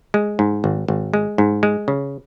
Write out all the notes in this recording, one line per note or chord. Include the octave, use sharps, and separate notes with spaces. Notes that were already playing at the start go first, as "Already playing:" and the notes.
G#3
G#2
G#1
G#1
G#3
G#2
G#3
C#3